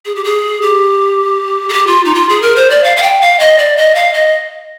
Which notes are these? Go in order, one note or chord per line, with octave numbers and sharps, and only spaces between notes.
G#4
G4
G#4
G4
G#4
G4
F4
D#4
F4
G#4
A#4
C5
D5
F5
F5
G5
F5
D#5
D5
D#5
F5
D#5